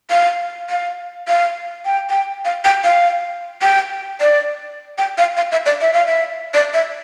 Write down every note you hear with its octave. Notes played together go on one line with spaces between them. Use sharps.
F5
F5
F5
G5
G5
F5
G5
F5
G5
D5
G5
F5
F5
E5
D5
E5
F5
E5
D5
E5